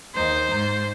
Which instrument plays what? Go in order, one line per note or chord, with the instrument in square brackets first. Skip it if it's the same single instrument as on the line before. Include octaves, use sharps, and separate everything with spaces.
[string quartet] D#2 D#4 [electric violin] C5
[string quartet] G#2 G6